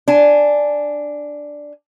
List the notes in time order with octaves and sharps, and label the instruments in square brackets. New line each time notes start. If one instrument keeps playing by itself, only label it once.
[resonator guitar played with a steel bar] D4 G#5